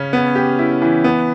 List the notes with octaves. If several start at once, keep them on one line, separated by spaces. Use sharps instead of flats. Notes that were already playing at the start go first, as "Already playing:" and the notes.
Already playing: C#3 C#4
B3
G4
E4
E3
B3